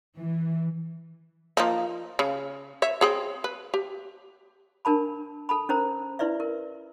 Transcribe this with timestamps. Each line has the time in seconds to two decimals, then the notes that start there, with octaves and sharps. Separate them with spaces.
0.18 E3
1.57 F3 A#3 D#4
2.19 C#3
2.82 C#5 E5
3.01 C4 G#4 C#5
3.44 B4
3.74 G4
4.85 D4 A#4 A5 B5
5.49 A4 A5 B5
5.69 C#4 A#4 C5 A#5
6.19 E4 B4 D5 E5
6.40 A#4